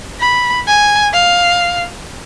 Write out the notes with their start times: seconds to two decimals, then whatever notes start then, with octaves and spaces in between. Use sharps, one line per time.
0.21 B5
0.67 G#5
1.13 F5